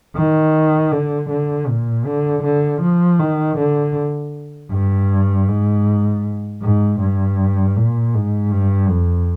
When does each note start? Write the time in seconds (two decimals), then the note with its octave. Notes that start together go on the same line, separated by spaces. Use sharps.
0.16 D#3
0.91 D3
1.30 D3
1.68 A#2
2.06 D3
2.43 D3
2.82 F3
3.19 D#3
3.58 D3
4.72 G2
5.48 G#2
6.62 G#2
7.00 G2
7.76 A#2
8.14 G#2
8.51 G2
8.89 F2